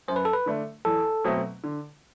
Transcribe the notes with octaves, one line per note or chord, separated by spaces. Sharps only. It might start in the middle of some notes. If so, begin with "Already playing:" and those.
F#2 C5
B4
A4
B4
D3 A3 D4
E2 A4
B2 F#3 A3 C4
D3